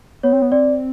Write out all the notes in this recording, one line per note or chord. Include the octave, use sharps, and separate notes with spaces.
B3 C#5
C4
B3
C4 D5